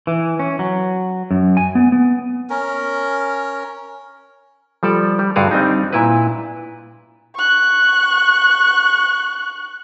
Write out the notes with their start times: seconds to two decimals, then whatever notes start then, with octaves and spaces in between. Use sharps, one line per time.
0.07 E3
0.39 C#4
0.59 F#3
1.31 F#2
1.57 G#5
1.75 B3
1.92 B3
2.50 C#4 A#4
4.83 F3 G3 A4 D5
5.19 G3
5.36 G2 D3 F#4 G#4 D5 F5
5.51 G3 C4 D4 D#4
5.93 A#2 E4 B4
7.35 C#6 F#6